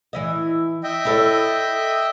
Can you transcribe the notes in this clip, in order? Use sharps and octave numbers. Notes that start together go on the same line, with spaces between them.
E3 E4 D#5
D#5 E5 G5
E4 A4 C#5